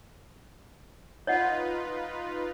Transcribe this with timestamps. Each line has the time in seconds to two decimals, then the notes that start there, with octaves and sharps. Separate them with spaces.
1.27 D#4 F4 B4 C#5 D#5 F#5